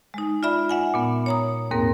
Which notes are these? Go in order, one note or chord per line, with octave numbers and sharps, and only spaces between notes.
G#3 D#4
F4 D5 E5 B5
E5 F#5 G#5
A#2 B3
C#5 A#5 D#6
D#2 G#2 A#3 C4 A#4